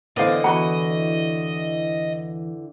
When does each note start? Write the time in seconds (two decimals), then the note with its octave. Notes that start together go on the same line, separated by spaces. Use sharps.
0.17 D3 E3 B3 C5 D5 D#5 F5
0.44 E2 F#4 F#5 B5